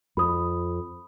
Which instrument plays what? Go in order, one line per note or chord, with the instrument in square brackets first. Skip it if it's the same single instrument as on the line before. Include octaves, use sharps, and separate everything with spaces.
[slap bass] F2 [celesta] B5 D#6